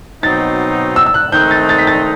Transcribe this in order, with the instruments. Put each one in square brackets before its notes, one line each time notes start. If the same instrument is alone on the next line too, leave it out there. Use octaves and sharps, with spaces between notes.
[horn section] B2 F#3 C4 D#4 [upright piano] A6
[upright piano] E6
E6
F#6
[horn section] D#3 A3 C4 D#4 [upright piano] G6
[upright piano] A6
A6
B6
A6